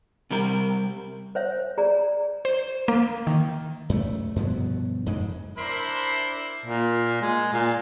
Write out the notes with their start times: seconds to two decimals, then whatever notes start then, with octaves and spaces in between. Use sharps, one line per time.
0.31 C3 G3 A#4
1.35 C5 C#5 E5
1.78 G#4 D5 A#5
2.45 C5
2.88 A#3
3.27 D#3
3.89 F#2 A3
4.36 G2 B2 F3 F#3
5.06 F2 G#2 C#3 G#3
5.58 D4 E4 A#4 C5 B5 C6
6.66 A#2
7.22 G#3
7.53 A#2